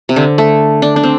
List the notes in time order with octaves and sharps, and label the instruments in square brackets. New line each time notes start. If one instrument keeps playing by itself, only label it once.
[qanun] C3
D3
A3
D4
D4
C4